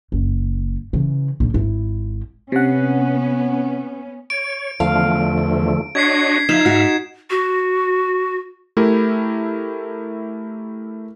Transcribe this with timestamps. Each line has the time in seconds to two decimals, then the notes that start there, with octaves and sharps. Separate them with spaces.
0.12 F#1
0.93 C#3 E3
1.40 A#1 A#3
1.54 G#1 E4
2.52 C3 B3 C#4 F#5
4.30 C#5 D7
4.80 E2 D3 F3 A3 F5
5.95 D4 F#4 C#5 D#5 G#6 B6 C7
6.49 F3 D#4 E5 F5 G#6 E7
6.66 G#2 F#4
7.30 F#4
8.77 A3 E4 G4 A#4